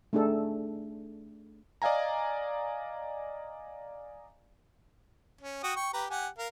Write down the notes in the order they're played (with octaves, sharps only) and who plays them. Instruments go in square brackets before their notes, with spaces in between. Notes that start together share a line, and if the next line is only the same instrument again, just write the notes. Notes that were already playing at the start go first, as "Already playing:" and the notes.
[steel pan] A3 D4 D#4 G#4 A4 G5
[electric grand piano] D5 D#5 F5 G#5 A#5
[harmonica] C#4
F#4 G5 D#6
G5 C#6
G4 B4 A#5
G4 F#5 G#5
A#4 F5